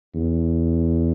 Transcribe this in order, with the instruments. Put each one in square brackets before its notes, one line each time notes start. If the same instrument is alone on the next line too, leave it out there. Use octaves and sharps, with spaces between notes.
[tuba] E2